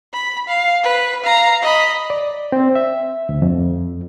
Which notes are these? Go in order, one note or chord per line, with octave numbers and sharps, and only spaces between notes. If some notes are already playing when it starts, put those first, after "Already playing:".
B5
F5
B4
F5 A#5
D#5 B5
D5
C4
E5
D2
F2